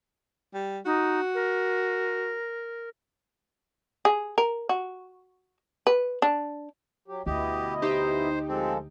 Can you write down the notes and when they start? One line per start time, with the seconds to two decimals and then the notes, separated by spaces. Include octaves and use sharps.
0.54 G3
0.86 D#4 F#4
1.35 A#4
4.05 G#4
4.38 A#4
4.69 F#4
5.87 B4
6.22 D4
7.08 F#3 G4
7.26 D2 B2 E4 G4 D#5
7.82 D#4 G4 C5
8.48 F3 G#3 C4 A4